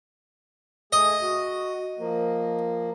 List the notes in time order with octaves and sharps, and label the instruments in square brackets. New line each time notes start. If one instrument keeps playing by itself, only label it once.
[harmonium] A3 G#4 [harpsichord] D#5
[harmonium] F#4
F3 A#3